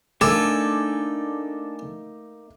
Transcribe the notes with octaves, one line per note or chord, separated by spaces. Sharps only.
A3 A#3 D4 D#4 A4 G#5 D6